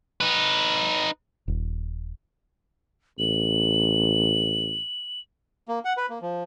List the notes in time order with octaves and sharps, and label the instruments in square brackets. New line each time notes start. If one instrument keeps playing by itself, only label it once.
[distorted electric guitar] D#4 B4
[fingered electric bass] D#1
[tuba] A1 [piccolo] F#7
[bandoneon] A#3
F#5
B4
A#3
F3